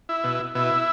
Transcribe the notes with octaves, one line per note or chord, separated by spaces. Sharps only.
E4
B2
B2 E4